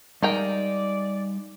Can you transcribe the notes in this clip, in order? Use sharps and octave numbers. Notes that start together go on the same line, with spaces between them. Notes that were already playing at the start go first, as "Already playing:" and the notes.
G3 G#3 D#4 A#4 D5 F5 G5